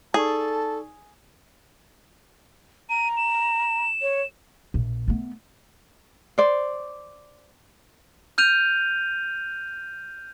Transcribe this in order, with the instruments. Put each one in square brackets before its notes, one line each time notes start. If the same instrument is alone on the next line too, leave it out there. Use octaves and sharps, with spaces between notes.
[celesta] D#4 D5 C#6 [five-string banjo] G#4 [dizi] A4 [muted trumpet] A5
[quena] A#5 [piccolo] D#7
[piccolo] E7
[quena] C#5
[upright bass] A#1
A3 B3
[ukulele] C5 D5
[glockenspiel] F6 G6 D#7 F7